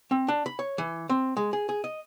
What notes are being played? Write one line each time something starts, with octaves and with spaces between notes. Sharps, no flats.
C4
D4
B5
C#5
E3
C4
G#3
G#4
G#4
D#5